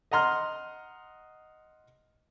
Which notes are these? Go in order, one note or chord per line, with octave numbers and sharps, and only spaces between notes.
D#5 F#5 A#5 C6 F6